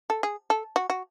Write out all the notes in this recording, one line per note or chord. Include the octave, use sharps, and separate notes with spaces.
A4
G#4
A4
F#4
F#4